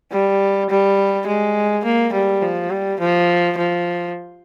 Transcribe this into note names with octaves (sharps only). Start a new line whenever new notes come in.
G3
G3
G#3
A#3
G3
F3
G3
F3
F3